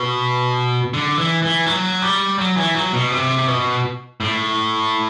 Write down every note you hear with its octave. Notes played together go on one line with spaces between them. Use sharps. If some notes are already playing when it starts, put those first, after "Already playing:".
Already playing: B2
D3
E3
E3
F#3
G3
F#3
E3
F#3
B2
C3
B2
A2